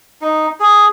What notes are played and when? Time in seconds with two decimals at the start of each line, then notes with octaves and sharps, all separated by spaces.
0.21 D#4
0.60 G#4